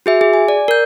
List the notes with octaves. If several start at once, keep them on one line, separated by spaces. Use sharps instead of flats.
F#4 G#4 E5
G#4
G#5
D5
A#4 G6